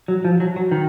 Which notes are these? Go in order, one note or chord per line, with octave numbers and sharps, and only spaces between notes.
F#3
F3
F#3
F#3
D#3